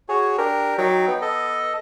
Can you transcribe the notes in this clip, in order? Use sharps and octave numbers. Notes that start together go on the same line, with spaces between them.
F#4 G#4 C#5
D4 G4 A#4
F#3 D#4 G5
B3
A4 D#5